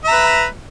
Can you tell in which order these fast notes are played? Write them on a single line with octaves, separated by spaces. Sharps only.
E5 A#5 B4